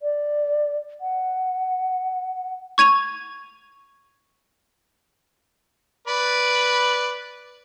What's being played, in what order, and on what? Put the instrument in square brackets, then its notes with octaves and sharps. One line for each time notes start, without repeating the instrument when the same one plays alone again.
[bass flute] D5
F#5
[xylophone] C#6 G#6 D#7 F7
[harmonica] B4 D5 B5